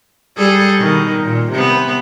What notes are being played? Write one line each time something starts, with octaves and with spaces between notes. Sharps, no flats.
G3 G#4 A4
B2 D#3
A#2
C3 B3